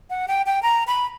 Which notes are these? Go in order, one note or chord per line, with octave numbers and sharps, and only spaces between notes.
F#5
G5
G5
A#5
B5